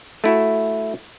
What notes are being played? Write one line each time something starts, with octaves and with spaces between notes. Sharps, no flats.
A3 E4 F#4